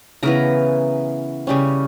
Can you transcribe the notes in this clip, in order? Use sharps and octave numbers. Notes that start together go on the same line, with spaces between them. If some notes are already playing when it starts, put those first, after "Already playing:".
C#3 E3 B3 A#4 A#5
C#3 G3 C#4